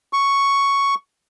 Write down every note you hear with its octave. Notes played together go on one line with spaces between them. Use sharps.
C#6